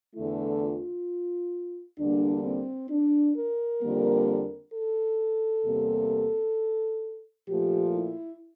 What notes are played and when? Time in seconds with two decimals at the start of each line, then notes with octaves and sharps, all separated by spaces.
0.15 E2 D3 A3 E4
0.61 F4
1.99 E2 D3 G3 A#3 D4
2.44 C4
2.90 D4
3.36 A#4
3.82 F2 D3 G3 A#3
4.74 A4
5.65 E2 C3 G3 A#3
7.48 A#2 F3 A3 G4
7.94 E4